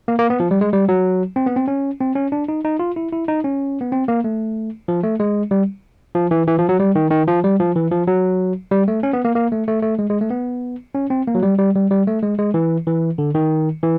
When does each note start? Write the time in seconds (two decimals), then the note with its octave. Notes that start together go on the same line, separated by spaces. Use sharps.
0.08 A#3
0.19 A#3
0.30 B3
0.40 F3
0.51 G3
0.61 G#3
0.73 G3
0.89 F#3
1.36 C4
1.46 B3
1.56 C4
1.68 C#4
2.00 C4
2.16 C#4
2.32 D4
2.48 D#4
2.64 D#4
2.79 F4
2.96 E4
3.12 E4
3.28 D#4
3.44 C#4
3.81 B3
3.92 C4
4.08 A#3
4.24 A3
4.88 F3
5.03 A3
5.20 G#3
5.51 G3
6.15 F3
6.31 E3
6.48 E3
6.58 F3
6.69 F#3
6.80 G3
6.95 D#3
7.11 D#3
7.28 F3
7.44 G3
7.60 F3
7.75 E3
7.91 F3
8.07 F#3
8.71 G3
8.88 A3
9.03 C#4
9.13 B3
9.25 A#3
9.35 A#3
9.52 A3
9.68 A3
9.82 A3
9.99 G#3
10.10 G#3
10.21 A3
10.30 B3
10.95 C#4
11.10 C4
11.27 A#3
11.35 F#3
11.43 G3
11.58 G3
11.75 G3
11.91 G3
12.07 A3
12.23 G#3
12.38 G#3
12.54 E3
12.87 E3
13.18 D3
13.35 D#3
13.83 E3